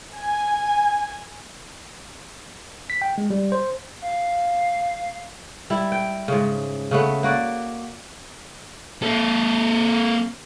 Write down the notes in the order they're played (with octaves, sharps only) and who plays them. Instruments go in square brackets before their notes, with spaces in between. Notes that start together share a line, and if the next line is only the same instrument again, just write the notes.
[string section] G#5
[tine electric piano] B6
G5
G#3
G3
C5
[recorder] F5
[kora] G3 E4
G5
G#2 C#3
C#3 A3 B3
A#3 F#4 D5
[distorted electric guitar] A#3 A4